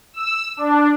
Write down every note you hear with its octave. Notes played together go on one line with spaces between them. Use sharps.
E6
D4